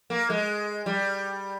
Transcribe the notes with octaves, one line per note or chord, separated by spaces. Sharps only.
A#3
G#3
G3